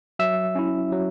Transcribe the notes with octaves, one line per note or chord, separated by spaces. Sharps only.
F#3 E5 E6
C#4 E4
F#3